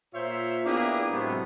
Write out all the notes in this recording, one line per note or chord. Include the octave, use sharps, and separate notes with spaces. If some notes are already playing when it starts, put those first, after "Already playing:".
A#2 F4 C5 C#5 E5
A#3 B3 D4 E4 G4 G#4
A2 C3 F#3 G#3 A3 B3